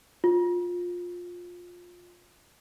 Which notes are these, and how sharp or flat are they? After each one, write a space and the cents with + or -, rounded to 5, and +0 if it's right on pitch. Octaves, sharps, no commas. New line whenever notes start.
F4 +20